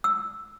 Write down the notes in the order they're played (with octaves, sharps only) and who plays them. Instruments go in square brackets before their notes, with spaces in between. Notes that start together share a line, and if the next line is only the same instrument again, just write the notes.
[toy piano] E6